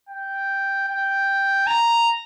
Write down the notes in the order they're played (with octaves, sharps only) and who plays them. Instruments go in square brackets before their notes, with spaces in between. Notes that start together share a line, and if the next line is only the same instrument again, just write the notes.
[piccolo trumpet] G5
G5
A#5